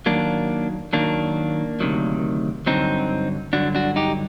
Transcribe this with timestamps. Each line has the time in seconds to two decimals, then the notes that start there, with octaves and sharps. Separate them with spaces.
0.06 D#2 D#3 F#3 A#3 D4
0.93 D#2 D#3 F#3 A#3 D4
1.80 D2 C3 D#3 F#3
2.66 G2 D3 F#3 C4 D#4
3.53 G2 D3 F#3 D4 F#4
3.75 D4 F#4
3.96 D#4 G4